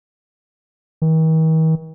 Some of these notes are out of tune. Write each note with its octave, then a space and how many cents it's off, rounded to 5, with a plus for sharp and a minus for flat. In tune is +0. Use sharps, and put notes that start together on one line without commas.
D#3 +45